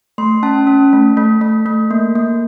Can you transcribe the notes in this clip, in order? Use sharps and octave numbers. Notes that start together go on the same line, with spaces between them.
A3 C6
C#4 A5
C#4
A3
A3
A3
A3
A#3
A#3